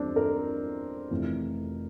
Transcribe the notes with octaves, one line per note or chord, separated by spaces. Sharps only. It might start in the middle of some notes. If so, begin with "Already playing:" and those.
Already playing: E2 E3 G3 C4 D4
A#4
F1 F2 E3